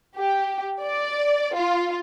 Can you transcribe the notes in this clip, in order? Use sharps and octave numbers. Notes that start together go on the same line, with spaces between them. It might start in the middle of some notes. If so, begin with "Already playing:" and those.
G4
D5
F4